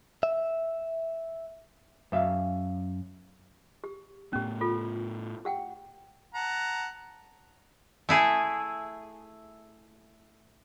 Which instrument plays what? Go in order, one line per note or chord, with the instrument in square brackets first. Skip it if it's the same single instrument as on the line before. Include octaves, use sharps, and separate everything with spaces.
[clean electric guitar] E5
[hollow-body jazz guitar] F#2 E5 F5
[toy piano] G4
[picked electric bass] A2 B3 [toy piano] C#4 G4
[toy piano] F4 A4
G4 F#5 G5
[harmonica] F#5 A5 A#5
[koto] A3 E4 G#4